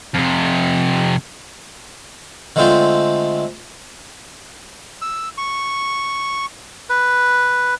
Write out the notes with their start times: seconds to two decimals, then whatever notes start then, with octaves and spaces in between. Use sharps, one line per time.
0.14 F2 C3
2.56 D3 G#3 A3 C4 F4 C5
5.02 E6
5.37 C#6
6.89 B4